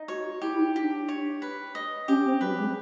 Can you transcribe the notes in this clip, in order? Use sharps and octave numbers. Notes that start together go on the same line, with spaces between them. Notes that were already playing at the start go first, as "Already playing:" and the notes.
Already playing: D#4
F#4 C#5
F#4
E4 G4
E4
D#4
D4 G4
C#5
B4
D#5
C#4 G4
C4
F#3 B4
G#3